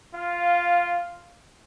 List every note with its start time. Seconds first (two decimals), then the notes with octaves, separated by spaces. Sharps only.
0.13 F4 F5